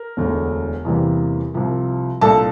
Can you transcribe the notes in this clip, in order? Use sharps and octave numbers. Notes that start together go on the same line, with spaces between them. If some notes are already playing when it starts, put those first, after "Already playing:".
Already playing: A#4
E1 D2 D3 A3
E2 C3 E3 G3 A#3
C2 C3 F3
C2 A#2 A3 D4 A4 A5